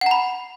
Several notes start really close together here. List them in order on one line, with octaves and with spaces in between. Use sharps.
F#5 A#5 B5